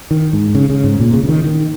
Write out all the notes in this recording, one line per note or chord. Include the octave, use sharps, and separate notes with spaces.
D#3
G#2
C#3
C#3
G#2
A#2
C#3
C#3
D#3
D#3